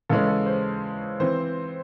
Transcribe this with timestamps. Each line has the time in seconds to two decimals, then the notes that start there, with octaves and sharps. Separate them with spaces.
0.09 C#3 E3 G#3 C#4 A4
0.28 A4
0.46 C5
1.20 E3 C4 C5